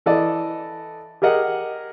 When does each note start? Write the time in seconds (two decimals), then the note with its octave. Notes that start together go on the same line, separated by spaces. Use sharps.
0.06 E3 A4 D5 D#5
1.22 G4 G#4 A#4 D#5 F#5